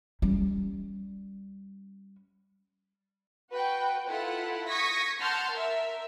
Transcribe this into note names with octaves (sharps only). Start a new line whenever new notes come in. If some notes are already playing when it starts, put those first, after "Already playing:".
G3 C#4
F#4 B4 G5
E4 F4 A4 F#5
C#6 D#6 G#6 A#6 B6 C#7
F#5 A5 C6 F6 G6 A6
A#4 E5